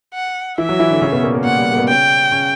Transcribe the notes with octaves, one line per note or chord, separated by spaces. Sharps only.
F#5
E3 E4 E5
F#3 F#4
E3 E4
D3 D4
C#3 C#4
B2 B3
A#2 A#3
A#2 A#3
A#2 A#3 F#5
G3
G3
A#3
B2 B3
C#3 C#4 G5
C#3 C#4